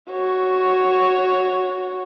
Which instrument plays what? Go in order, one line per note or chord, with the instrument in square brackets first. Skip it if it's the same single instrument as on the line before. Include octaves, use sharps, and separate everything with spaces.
[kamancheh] F#4 C#5